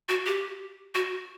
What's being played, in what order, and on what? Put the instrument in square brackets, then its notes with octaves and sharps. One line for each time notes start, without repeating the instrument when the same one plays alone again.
[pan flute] F#4
G4
F#4